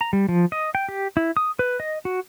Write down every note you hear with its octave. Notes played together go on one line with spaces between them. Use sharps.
A#5
G3
F3
D#5
G5
G4
E4
D#6
B4
D#5
F#4